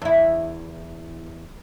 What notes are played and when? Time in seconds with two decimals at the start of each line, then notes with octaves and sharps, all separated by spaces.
0.02 E2 E4